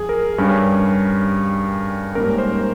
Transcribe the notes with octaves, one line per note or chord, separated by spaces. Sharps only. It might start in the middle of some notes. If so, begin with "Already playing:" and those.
Already playing: F3 G#4
A#4
G2 G3 C#4
G#2 G3 A#3 C#4 A#4
C5